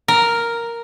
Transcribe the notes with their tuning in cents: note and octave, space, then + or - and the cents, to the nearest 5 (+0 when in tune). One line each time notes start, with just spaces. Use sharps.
A#4 +0